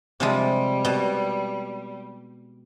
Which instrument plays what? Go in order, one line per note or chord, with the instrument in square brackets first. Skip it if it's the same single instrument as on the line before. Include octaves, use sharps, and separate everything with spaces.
[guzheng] C3 F3 G#3 [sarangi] G3
[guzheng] B2